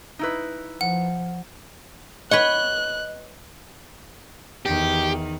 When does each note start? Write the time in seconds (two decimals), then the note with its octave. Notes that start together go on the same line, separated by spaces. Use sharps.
0.19 D#4 E4 B4
0.81 F3 F#5
2.31 B4 C#5 D#5 F#5 F#6
4.66 E2 D#3 G4